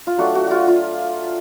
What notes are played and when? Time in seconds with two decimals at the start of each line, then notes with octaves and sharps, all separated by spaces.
0.07 F4
0.18 F#3 A3 D4 F#4
0.35 F#4
0.47 F4 F#4
0.68 F4